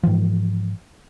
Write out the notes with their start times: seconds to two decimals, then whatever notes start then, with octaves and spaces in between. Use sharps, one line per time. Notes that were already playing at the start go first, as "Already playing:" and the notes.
0.03 G#2 C#3 E3 F3